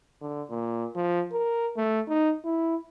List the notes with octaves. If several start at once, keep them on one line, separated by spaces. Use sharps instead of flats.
D3
A#2
F3
A#4
A3
D#4
E4